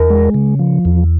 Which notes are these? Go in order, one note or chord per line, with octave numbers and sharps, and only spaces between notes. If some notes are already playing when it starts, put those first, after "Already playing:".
Already playing: E2 A#4
G#3
C#3
F3
E2